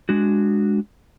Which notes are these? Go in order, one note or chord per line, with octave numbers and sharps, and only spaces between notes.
G#3 D4 F#4